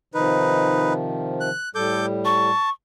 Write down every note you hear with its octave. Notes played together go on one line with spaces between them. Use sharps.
C3 D#3 F3 D#4 B4
F#6
A2 G3 A4 D6 G6
A5 C#6